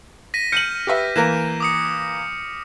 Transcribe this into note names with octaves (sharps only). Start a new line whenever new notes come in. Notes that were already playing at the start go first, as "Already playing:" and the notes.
A#6 B6 D#7
F6 G6 C#7 D#7 F#7
G4 B4 E5
E3 A#3 A#4 E7
D6 D#6 C#7